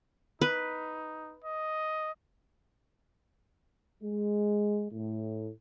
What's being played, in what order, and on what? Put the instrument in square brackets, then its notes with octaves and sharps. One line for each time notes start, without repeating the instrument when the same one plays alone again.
[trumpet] D#4 [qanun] B4
[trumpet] D#5
[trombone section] G#3
A2